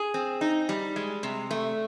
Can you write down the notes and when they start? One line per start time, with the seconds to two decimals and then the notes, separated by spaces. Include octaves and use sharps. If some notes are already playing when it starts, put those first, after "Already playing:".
Already playing: G#4
0.14 C4
0.41 D#4
0.69 G3
0.96 G#3
1.23 C3
1.51 A3